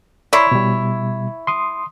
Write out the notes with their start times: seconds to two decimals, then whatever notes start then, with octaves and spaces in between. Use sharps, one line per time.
0.33 E4 C#5 D5 A#5 C6
0.52 B2 G3
1.47 C6 D#6